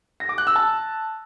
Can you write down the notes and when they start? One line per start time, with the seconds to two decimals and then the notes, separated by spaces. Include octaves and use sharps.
0.20 A#6
0.29 D6
0.38 F#6
0.47 E6
0.56 A5